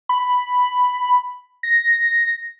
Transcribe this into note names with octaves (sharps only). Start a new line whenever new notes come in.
B5
A#6